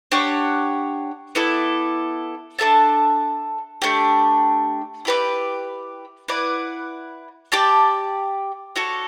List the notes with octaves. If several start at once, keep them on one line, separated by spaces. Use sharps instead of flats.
D4 G4 C#5 F#5
B3 E4 A4 D5
D4 A4 E5 A5
A3 D4 G4
E4 G4 B4 D5
E4 B4 D5 F#5
G4 D5 A5
D4 F#4 A4 C#5